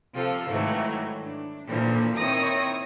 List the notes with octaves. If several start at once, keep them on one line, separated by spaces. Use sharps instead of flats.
C3 F3 F4 A4
G#2 D#3 E3 F#3 A3
D4
A#2 D3 E3 F3 C#4
D#3 C4 E4 C#5 D#6 A#6